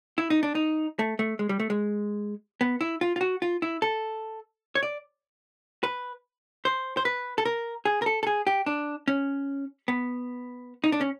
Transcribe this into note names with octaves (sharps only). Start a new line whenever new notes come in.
E4
D#4
D4
D#4
A3
A3
G#3
G3
A3
G#3
B3
E4
F4
F4
F#4
F4
E4
A4
C#5
D5
B4
C5
C5
B4
A4
A#4
G#4
A#4
A4
A4
G#4
G4
D4
C#4
B3
D#4
D4
C#4